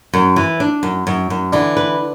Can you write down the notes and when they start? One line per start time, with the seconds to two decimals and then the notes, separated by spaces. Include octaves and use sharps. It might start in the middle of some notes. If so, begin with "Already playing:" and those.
0.13 F#2
0.36 E3
0.60 D4
0.83 F#2
1.07 F#2
1.30 F#2
1.53 D3 E3
1.77 B4